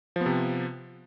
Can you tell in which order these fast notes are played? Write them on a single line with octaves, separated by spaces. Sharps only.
F3 B3 C3